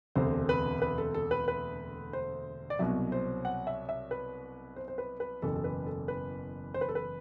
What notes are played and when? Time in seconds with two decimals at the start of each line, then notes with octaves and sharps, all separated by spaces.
0.15 E1 D2 C3 C5
0.49 B4
0.82 B4
0.98 A4
1.14 A4
1.31 B4
1.48 B4
2.13 C5
2.70 D5
2.79 C2 B2 F#3 E5
3.12 C5
3.45 F#5
3.67 E5
3.89 E5
4.11 B4
4.76 C5
4.88 C5
4.98 B4
5.20 B4
5.42 F#1 E2 B2 A4
5.56 A4
5.64 B4
5.86 A4
6.08 B4
6.74 C5
6.81 B4
6.89 A4
6.95 B4